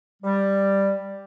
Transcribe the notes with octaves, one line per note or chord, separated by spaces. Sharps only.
G3